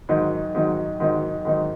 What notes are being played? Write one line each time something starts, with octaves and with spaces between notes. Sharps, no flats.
G#2 D#3 F#3 D#4
G#2 D#3 F#3 D#4
G#2 D#3 F#3 D#4
G#2 D#3 F#3 D#4